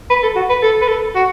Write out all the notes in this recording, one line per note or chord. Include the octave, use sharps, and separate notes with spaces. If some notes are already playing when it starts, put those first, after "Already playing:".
B4
A4
F#4
B4
A4
B4
A4
F#4